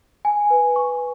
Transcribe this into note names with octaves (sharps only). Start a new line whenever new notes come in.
G#5
B4
C#6